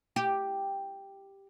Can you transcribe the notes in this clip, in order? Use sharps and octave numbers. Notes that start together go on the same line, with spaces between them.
G4